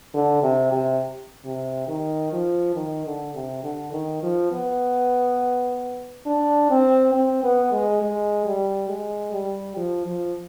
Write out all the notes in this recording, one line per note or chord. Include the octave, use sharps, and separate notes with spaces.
D3
C3
C3
C3
D#3
F3
D#3
D3
C3
D3
D#3
F3
B3
D4
C4
C4
B3
G#3
G#3
G3
G#3
G3
F3
F3